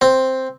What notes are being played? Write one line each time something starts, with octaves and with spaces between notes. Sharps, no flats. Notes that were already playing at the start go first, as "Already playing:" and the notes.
C4